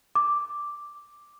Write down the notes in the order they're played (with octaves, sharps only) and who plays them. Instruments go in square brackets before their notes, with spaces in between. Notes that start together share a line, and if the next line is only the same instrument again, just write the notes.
[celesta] D6